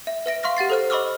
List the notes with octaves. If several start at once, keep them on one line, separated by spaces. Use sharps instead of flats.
E5
B4 E5 A#6 D7
F5 C6 C#6 F6 A#6
G4 F#5 A6 C7
A4 C5 F6
D#5 B5 C#6 D6 E6 F6